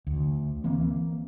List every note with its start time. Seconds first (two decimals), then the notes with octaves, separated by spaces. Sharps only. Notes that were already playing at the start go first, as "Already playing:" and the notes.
0.07 D2
0.64 E3 A#3 C4